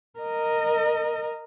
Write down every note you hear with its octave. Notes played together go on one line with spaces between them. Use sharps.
A#4 D#5